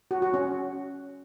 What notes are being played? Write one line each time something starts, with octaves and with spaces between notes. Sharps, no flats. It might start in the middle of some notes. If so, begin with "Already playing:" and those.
F#4
F#4
C#4